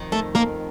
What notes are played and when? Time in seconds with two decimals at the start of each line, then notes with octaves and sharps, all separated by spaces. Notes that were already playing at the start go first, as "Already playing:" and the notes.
Already playing: F2 D#3
0.12 A3 A4
0.35 A#3 A#4